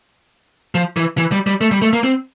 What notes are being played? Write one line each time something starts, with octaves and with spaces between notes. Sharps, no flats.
F3
E3
E3
G3
G3
A3
G3
A3
A#3
C4